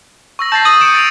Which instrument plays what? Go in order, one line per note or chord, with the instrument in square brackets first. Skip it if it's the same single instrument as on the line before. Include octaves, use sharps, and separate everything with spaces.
[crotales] C#6 E6 A#6
[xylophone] A5 [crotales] G6 A6 C7
[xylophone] D#6 F#7 [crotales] D#7
[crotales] C#7 D7 E7
A6 D7 F7